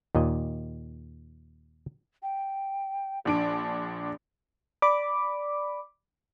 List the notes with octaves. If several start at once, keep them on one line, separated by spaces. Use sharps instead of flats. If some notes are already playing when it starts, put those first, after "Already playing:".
D#2 A#2 D#5
G5
A#1 D4 A5 D7
D5 B5 D6